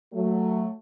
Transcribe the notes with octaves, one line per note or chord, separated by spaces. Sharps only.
F#3 A3